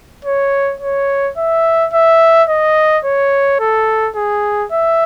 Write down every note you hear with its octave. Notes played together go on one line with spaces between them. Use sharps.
C#5
C#5
E5
E5
D#5
C#5
A4
G#4
E5